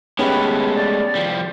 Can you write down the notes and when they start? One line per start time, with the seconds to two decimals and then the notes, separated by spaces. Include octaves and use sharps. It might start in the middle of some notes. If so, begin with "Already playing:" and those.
0.19 G#3 A3 B3 C#4 G4 B4
0.75 D5
1.15 F3 G3